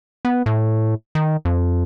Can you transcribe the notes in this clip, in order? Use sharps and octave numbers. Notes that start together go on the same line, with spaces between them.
B3
A2
D#3
F2